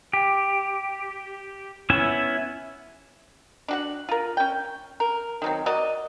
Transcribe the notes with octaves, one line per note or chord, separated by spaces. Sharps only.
G4
B3 C#4 E4 E5
D4 F#4 F#5
F4 A#4
C#4 G5
A#4
D#3 F#3 C4
F#4 A#4 D5 D#5